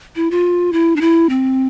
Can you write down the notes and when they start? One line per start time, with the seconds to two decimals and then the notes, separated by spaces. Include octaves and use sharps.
0.16 E4
0.31 F4
0.73 E4
0.96 D4
1.01 E4
1.29 C4